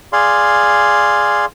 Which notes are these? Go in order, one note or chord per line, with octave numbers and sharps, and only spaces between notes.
G#4 D5 F5 C6